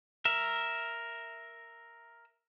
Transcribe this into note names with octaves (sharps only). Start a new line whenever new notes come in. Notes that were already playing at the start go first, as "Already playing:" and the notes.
A#4 E5